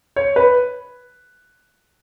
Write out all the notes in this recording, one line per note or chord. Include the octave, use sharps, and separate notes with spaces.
C#5
B4